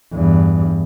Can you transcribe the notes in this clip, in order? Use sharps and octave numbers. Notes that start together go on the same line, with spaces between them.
E2 G2